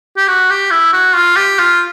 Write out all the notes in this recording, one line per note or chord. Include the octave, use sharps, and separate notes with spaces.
G4
F#4
G4
E4
F#4
F4
G4
F4